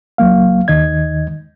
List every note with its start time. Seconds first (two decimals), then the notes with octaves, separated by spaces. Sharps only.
0.18 C#2 F#3 A#3 F5
0.68 D#2 D#3 D#5 G#6